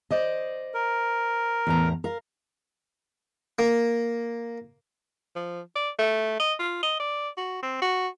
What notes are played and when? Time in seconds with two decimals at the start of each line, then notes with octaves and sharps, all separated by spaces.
0.11 C5 D5 D#5
0.74 A#4
1.67 E2 A2 A#5
2.04 A#4 F5
3.59 A#3
5.36 F3
5.75 D5
5.99 A3
6.39 D#5
6.59 F4
6.83 D#5
6.99 D5
7.37 F#4
7.62 C4
7.81 F#4